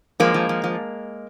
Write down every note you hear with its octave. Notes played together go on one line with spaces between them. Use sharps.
F3 G#3 A#3
F3
F3
F3